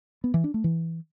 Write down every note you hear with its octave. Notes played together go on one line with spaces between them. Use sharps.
B3
E3
D4
A3
E3